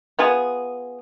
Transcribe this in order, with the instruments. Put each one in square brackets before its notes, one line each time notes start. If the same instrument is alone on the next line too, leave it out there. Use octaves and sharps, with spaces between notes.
[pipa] B3 F4 G#4